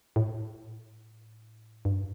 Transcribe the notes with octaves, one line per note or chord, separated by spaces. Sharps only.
A2
G2